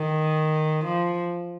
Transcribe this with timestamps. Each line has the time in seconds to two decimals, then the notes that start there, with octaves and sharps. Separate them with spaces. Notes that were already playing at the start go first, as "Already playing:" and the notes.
Already playing: D#3
0.84 F3